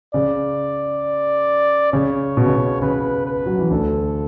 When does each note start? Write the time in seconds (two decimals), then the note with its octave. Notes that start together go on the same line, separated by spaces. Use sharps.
0.14 C#3 D5
1.92 C#3 C#5
2.37 B2
2.46 C#3
2.55 B2
2.81 C#3 B4
3.26 B4
3.46 F#3
3.59 E3
3.70 D2 D3 A4